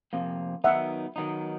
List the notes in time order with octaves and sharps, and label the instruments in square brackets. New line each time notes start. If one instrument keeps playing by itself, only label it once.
[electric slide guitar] F2 C3 F3 A#3
[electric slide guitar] D#3 F#3 B3 D#4 [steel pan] E5 F#5
[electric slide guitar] D#3 F#3 B3 D#4